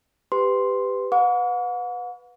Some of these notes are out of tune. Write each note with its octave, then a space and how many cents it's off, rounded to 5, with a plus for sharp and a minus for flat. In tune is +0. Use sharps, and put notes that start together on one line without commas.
G4 +10 B4 +25 C6 +0
B4 +0 F#5 -45 C#6 +45